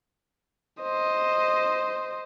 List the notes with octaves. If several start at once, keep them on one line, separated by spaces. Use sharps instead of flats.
C5 D#5